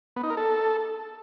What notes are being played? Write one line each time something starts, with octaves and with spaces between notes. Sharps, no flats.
B3
D#4
A#4
A4